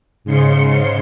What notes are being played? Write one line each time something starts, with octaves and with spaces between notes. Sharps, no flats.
G#2 C#3 C6 C#7